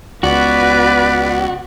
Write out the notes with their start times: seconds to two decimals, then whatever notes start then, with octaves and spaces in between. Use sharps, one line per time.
0.23 C#2 B3 F#4 B4 D5